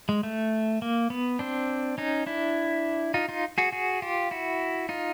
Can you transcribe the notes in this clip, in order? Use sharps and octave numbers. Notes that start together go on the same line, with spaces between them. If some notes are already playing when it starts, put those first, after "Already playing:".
G#3
A3
A#3
B3
C4 D4
C#4 D#4
D4 E4
D#4 F4
D#4 F4
F#4 G#4
F#4 G#4
F4 G4
E4 F#4
D#4 F4